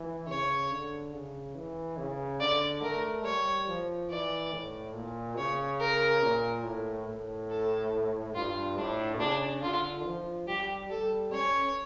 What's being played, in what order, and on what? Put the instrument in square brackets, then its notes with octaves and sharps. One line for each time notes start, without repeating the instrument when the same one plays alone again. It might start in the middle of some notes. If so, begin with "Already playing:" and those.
Already playing: [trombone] E3
[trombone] C#3 [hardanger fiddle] C#5
[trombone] D3
C#3
E3
C#3
[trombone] D3 [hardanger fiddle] D5
[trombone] A3 [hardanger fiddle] A#4
[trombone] G3 [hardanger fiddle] C#5
[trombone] F3
[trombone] E3 [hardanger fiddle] D5
[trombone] A2
A#2
[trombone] C#3 [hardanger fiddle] C#5
[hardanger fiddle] A#4
[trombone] A#2
A2
A2
[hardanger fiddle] A4
[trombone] G2 [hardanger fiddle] F4
[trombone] A2 [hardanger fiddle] D4
[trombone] C#3 [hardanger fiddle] D4
[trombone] D3 [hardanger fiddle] F4
[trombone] F3
[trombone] G3 [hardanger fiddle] G4
[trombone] G3 [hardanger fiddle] A4
[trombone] C#4 [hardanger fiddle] C#5